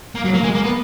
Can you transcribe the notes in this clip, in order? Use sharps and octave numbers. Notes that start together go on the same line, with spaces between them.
A#3
F#3
A#3
G#3
A#3
B3